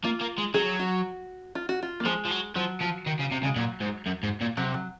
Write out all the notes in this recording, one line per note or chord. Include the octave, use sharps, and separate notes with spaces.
A#3 F4
A#3
G#3
F#3 G#4
F#4
F4
F#4
F4
A#3
F3 G#3
F3
F#3
F3 F#3
F3
D#3
C#3
C3
C#3 G#3
A#2 F#3
G#2
F#2
G#2
A#2
C3 F#3
F#3